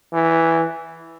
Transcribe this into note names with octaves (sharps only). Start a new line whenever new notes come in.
E3